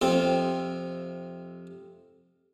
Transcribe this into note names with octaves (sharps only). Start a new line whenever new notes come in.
F2 C3 C4 F4